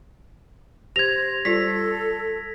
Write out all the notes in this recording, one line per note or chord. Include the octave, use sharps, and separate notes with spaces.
G4 C5 G#6 A#6 F7
G3 F4 A4 B6